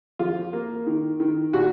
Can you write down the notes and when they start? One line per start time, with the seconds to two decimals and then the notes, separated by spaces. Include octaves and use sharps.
0.19 F3 F4
0.53 A#3
0.87 D#3
1.20 D#3
1.53 A#2 F#4